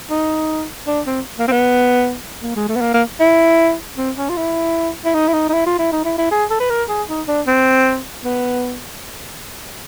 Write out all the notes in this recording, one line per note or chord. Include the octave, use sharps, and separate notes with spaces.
D#4
D4
C4
A#3
C4
B3
A#3
G#3
A3
B3
A#3
A#3
E4
C4
C#4
F4
E4
E4
D#4
E4
D#4
D#4
E4
F4
E4
D#4
E4
E4
G#4
A4
B4
A#4
G#4
D#4
D4
C4
B3